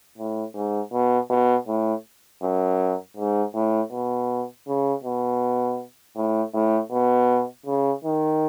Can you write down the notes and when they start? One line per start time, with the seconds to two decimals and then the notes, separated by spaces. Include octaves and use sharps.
0.18 A2
0.54 G#2
0.92 B2
1.30 B2
1.68 A2
2.42 F#2
3.17 G#2
3.55 A2
3.92 B2
4.67 C#3
5.04 B2
6.16 A2
6.54 A2
6.92 B2
7.66 C#3
8.04 D#3